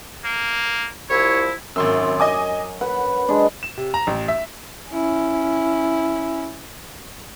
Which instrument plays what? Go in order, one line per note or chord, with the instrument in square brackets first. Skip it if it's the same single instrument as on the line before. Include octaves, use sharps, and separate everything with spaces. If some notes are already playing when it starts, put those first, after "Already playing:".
[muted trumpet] A#3
[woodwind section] C2 F3 E4 [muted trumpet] C#5
[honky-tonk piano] G#1 C6 E6 [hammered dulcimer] F#2
[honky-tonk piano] D#5 G#5 D6
[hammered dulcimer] B4 [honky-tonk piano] F#5
[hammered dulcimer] G#3 D4
[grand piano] E7
C3
A#5
A1
E5
[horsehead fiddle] C#4 E4